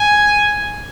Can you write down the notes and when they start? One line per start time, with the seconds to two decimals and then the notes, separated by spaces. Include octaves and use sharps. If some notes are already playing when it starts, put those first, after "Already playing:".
Already playing: G#5